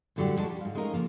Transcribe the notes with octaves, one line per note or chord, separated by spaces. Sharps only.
F#2 A2 D3 F#3 G3
D2 A#2 F#3 G#3 A3 A5
G3
G#2 F5
G#3 A3 C#4 D#4 A#4 F5
C#3 F3 A#3